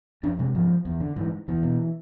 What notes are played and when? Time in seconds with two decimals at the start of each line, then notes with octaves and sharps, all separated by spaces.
0.23 F2 D4
0.39 C3 G#3
0.55 G#2 F3
0.85 E2
1.01 D3
1.16 G#2 E3
1.48 E2 E3
1.63 B2